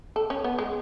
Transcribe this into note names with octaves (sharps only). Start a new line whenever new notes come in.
A4
C#4
B3
G#3